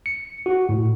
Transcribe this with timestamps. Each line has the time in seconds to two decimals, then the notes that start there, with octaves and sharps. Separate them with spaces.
0.06 C#7
0.46 F#4
0.69 A2